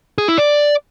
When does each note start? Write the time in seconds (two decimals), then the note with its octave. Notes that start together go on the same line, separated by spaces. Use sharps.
0.18 G#4
0.28 E4
0.38 D5